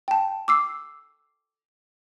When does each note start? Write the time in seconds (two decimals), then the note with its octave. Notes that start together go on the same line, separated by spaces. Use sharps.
0.08 G5 A5
0.48 D6 E6 C7